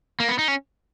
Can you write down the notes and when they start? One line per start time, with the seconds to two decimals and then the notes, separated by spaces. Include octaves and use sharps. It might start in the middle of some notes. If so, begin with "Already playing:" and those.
0.20 A#3
0.29 B3
0.39 D#4
0.48 C#4